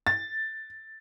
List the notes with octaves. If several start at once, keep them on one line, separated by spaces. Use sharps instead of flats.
A6